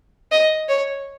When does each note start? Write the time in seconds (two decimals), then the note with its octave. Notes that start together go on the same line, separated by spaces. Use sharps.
0.31 D#5
0.68 C#5